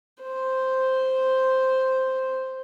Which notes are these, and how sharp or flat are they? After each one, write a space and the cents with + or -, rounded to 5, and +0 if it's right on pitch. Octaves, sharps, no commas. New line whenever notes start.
C5 +0